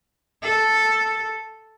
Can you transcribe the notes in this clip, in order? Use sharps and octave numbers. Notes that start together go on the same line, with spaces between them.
A4